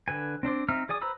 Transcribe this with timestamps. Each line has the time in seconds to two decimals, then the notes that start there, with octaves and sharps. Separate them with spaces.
0.08 D3 B4 G#5
0.43 C4 D4 C5 D5
0.69 C4 D#4 E5 A#5 F6
0.89 G#4 D5 G#5 D#6
1.02 B4 C5 A#5 B5 E6